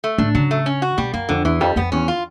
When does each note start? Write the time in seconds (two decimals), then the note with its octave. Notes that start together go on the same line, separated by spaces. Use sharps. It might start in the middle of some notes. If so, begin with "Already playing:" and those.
0.04 A3
0.18 A2 D4
0.35 C#3 F#3
0.51 A3
0.66 C#4
0.82 F#4
0.98 B2 G3
1.14 F#2 A#3
1.29 F2 D3
1.45 E2 E3
1.61 F2 G3
1.76 F2 B3
1.92 E2 C#4
2.08 F4